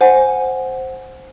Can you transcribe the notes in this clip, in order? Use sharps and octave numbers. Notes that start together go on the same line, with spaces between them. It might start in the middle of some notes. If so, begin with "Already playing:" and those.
C5 F#5 G#5